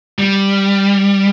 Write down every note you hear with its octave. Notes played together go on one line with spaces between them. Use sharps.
G3